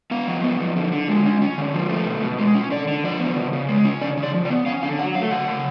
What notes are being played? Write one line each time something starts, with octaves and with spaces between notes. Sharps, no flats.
B3 F5
F3
B3
F3
D3
D3
G#3
C#4
C#4
D3
F3
A3
B2
B2
G#3
C#4
D3 D5
D3
F3 D5
B3
C#3
C#3
G#3
C#4
C#3 D5
C#3
D5
F3
D5
B3
C#4 F5
D3 F5
F#3 F#5
A3 F5
C#3 F#5
C#3